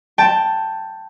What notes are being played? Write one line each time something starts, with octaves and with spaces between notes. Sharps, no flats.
G5 A5